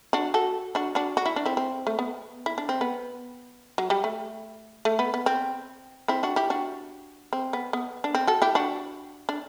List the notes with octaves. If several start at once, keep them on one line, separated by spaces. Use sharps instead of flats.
D4 F#4
F#4 A4
D4 F#4
D4 F#4
F#4
E4
D4
C4 E4
C4
A3
B3
E4
D4
C4
B3
F#3
G3
A3
A3
B3
B3
C4
C4 E4
D4 F#4
E4 G4
D4 F#4
C4
B3
B3
D4
C4
F#4 A4
E4 G4
D4 F#4
D4